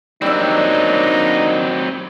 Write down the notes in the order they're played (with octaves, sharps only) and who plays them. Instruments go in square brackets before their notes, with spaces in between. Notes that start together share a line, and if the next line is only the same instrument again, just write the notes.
[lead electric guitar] F#3 C4 [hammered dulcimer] G3 E5 [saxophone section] A#3 D4 [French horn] D#4